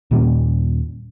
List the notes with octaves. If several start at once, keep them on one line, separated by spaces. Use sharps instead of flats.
D#2 A#2 G3 C#4